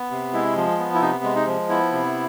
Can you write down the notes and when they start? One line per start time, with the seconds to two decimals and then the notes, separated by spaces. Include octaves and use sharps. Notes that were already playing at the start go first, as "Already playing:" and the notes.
Already playing: B3
0.11 C3
0.33 G#3 E4
0.56 F3
0.78 B3
0.94 E4
1.01 C3 D#4
1.24 G#3
1.35 D#4
1.46 F3
1.69 B3 E4
1.92 C3